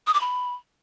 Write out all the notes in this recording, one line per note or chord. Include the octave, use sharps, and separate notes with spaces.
D#6
D6
B5